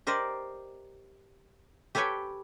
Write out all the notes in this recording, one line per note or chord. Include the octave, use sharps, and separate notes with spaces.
G4 A#4 C5 D5 D#5
G4 A4 B4 C#5 G5 G#5